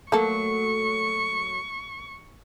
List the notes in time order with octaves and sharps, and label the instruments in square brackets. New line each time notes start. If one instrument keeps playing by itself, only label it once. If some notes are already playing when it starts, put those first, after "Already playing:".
[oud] F#3 A3 [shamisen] A#3 A4 [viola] C#6